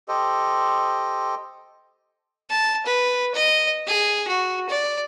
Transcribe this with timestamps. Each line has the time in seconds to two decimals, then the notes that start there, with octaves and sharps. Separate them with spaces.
0.08 G4 A4 C5 D#5
2.50 A5
2.86 B4
3.35 D#5
3.86 G#4
4.28 F#4
4.69 D5